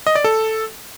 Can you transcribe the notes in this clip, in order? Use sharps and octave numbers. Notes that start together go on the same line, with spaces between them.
D#5
D5
A4